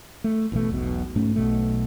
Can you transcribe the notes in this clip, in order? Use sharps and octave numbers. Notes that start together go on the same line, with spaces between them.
A3
A1 B2 F#3 A3
E1 B1 B2
G#2 A3 C#4
B1 B2 A3